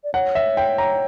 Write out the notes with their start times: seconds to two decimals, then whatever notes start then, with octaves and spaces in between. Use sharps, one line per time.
0.04 D5
0.14 C#5 F#5
0.35 E5
0.57 G5
0.78 A#5